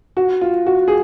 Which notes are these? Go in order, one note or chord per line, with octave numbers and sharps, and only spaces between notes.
F#4
F4
F#4
G#4